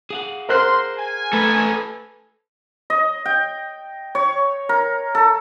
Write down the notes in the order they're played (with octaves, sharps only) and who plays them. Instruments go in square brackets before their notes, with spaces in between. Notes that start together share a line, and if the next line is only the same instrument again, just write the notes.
[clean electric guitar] G#4 F5 F#5
[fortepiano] A#4 C5 F#6 [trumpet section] C6
[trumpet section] G#5
[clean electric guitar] A3 [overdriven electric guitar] A4 B4
[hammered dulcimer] D#5
G5
C#5
A#4
A4